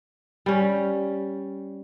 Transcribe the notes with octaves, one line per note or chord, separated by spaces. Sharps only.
G3 C#4